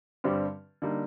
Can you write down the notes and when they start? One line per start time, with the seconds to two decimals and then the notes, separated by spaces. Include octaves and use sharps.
0.24 G2 D3 G3 C4 G4
0.82 D3 G3 A#3 D#4